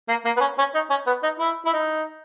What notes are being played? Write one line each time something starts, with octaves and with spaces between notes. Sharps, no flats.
A#3
A#3
B3
C#4
C#4
D#4
C#4
B3
D#4
E4
E4
D#4